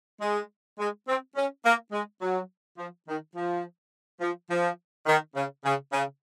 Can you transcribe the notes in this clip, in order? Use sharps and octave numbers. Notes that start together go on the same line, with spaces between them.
G#3
G#3
C4
C#4
A#3
G#3
F#3
F3
D#3
F3
F3
F3
D#3
C#3
C#3
C#3